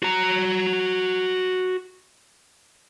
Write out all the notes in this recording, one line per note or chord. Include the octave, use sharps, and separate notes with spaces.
F#4 A#5